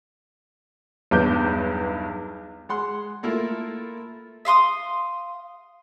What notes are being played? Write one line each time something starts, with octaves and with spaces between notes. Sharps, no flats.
B1 E2 G2 B4 D6 G6
G#3 F#5 C6
A3 A#3 E4 F4 A4
E5 F5 C6 D#6